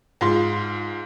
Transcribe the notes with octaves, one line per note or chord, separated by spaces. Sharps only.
G#2 F4 C6